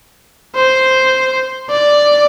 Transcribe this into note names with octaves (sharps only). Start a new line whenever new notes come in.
C5
D5